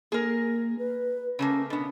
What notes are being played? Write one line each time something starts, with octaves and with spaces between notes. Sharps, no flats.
A#3 G#4 A#4
B4
C#3 A3 A#3 C#4
B2 B3 D4